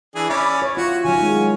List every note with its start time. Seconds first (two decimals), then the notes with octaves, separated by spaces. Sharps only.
0.15 E3 D4 G#4
0.30 C#4 D5 E5 B5
0.62 C#5
0.77 F4 F#4
1.05 D#3 F#3 C#4 G#5
1.19 G#3 F#4